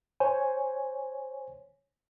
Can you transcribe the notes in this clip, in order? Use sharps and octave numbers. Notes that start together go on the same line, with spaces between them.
C5 C#5 G#5